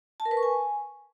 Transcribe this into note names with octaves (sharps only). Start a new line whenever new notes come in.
A5
A#4
B4
C#6
G#5